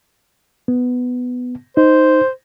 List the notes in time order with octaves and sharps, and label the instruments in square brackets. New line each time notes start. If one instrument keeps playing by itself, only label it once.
[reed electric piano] B3
[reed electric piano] D#4 [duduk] C5